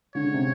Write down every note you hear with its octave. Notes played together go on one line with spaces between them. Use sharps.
D3 C#5
C#3
C3